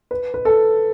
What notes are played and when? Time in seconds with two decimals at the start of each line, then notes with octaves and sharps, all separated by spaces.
0.11 B4
0.34 B4
0.45 A4